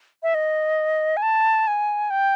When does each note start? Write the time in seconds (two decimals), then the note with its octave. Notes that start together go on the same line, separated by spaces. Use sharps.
0.23 E5
0.34 D#5
1.17 G#5
1.22 A5
1.67 G#5
2.10 G5